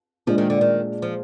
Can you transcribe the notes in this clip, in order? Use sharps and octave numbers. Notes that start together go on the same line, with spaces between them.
A#2 F3 G#3 D4
D#3
D3
D#3
F3